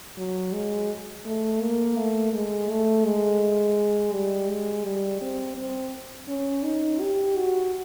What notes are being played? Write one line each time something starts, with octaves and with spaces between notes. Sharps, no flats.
F#3
G#3
A3
A#3
A3
G#3
A3
G#3
G3
G#3
G3
C4
C4
C#4
D#4
G4
F#4